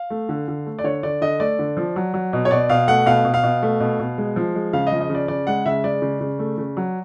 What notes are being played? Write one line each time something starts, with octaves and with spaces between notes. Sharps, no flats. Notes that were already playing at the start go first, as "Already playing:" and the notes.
Already playing: F5
A3
D3
D3
A3
D5
D3 C#5
D3 D5
D3 D#5
A3 D5
D3
F3
F#3
F#3
B2
C#5
B2 D5
B2 F5
A3 F#5
B2 F5
B2
F5
B2
A3
B2
B2
G#3
F3
G#3
C#3 F5
F3 D#5
D#5
C#3 D5
C#3 D5
G#3 F#5
C#3 E5
G#3 D5
C#3
C#3
A3
C#3
F#3